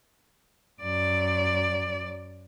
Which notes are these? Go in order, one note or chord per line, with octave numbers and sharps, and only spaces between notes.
F#2 D5